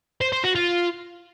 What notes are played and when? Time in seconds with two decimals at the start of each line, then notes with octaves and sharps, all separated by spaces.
0.21 C5
0.33 C5
0.44 F#4
0.55 F4